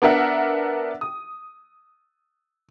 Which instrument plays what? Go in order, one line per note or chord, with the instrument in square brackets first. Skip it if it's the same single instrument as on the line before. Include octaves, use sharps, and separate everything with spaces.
[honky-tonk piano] B3 D4 A#4 E5 F#5
D#6